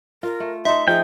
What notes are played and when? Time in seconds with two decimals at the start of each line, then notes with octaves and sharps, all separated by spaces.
0.23 F4 A#4
0.40 A3
0.65 D#4 A4 E5 C6
0.88 F3 D#4 G#4 F5 G5